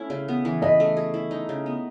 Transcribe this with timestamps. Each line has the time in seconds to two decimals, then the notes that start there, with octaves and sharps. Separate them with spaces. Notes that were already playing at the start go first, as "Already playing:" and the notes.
Already playing: A3 C#4 E4
0.10 C#3
0.28 B3
0.45 E3
0.62 B4 D#5
0.80 A3
0.97 G#4
1.14 E4
1.31 D#4
1.49 C#3
1.66 B3